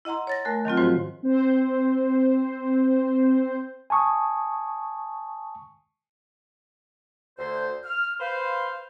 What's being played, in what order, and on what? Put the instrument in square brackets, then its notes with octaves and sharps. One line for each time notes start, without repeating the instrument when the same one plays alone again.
[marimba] E4 D#5 F#5 A#5 C6
C#5 A6 A#6
A3 A#4 G#5 F#6
D#3 F#3 C4 F4
G#2 D#3 F3 F#4 C5
[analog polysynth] C4 C5
[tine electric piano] G#5 A5 C#6 D#6
[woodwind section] D2 C5
F6
B4 C5 F5